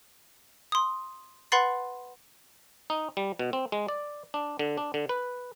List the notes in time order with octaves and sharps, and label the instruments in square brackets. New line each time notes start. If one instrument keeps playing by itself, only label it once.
[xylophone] C6 D#6
B4 F#5 B5 C6 A6 C7
[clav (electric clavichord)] D#4
G3
B2
C4
G#3
D5
D4
D3
D4
D3
B4